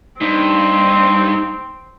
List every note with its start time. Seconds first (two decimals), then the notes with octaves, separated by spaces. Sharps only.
0.21 G2 C4 D#4